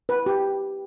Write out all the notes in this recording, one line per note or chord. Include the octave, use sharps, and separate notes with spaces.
B4
G4